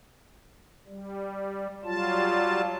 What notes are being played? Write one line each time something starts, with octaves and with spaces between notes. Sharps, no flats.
G3
F#3 G3 F4 A5